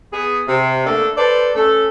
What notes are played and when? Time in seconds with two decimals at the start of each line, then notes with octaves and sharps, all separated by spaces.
0.12 B3 G#4
0.47 C3
0.85 D3 A3 A#3 D4 A4
1.16 A4 B4 C5 D5
1.55 A3 C#4 A4